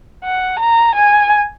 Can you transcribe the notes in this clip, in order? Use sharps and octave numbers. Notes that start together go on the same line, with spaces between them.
F#5
A#5
G#5